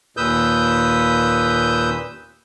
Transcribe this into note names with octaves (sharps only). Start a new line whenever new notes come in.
D#2 A#2 B4 D#6 E6 G6